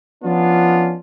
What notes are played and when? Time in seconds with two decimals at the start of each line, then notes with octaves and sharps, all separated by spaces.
0.24 F3 B3 C#4 D4 F4